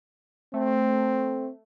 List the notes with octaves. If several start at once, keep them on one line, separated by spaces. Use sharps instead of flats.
A3 C4